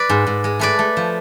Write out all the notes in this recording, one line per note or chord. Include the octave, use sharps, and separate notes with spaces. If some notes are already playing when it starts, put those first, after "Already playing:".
Already playing: B4 D5
G#2
G#2
G#3
A3 B4 D5
A3
F3